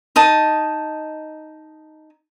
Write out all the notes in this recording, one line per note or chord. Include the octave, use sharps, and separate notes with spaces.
D#4 D#5 A5